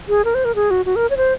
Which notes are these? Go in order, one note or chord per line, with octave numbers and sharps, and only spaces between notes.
G#4
A#4
C5
A#4
G#4
F#4
F#4
A#4
C#5
C5